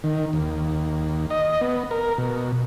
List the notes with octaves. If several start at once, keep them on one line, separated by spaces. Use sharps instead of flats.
D#3
D#2
D#5
B3
A#4
B2